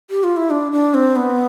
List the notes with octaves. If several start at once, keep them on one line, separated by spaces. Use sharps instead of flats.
G4
F4
E4
D4
D4
C4
B3